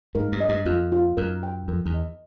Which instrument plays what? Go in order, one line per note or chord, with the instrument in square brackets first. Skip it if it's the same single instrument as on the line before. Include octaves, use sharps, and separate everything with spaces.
[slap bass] G#2 [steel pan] A#4
[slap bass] G2
[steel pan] D#5
[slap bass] G2
[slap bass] F2 [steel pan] F4
[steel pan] F4
[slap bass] F#2 [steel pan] A#4
[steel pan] G5
[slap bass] F2 [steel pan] A#4
[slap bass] E2
[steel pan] D#5